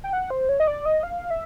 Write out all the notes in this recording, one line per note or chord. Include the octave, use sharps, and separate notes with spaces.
G5
F#5
C5
C#5
D#5
D5
D#5
F5
E5